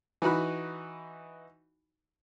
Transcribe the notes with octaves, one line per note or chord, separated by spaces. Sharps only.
E3 D#4 F#4 B5 F#6